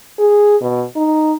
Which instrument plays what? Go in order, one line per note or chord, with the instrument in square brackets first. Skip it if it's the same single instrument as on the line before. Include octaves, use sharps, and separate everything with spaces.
[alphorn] G#4
B2
D#4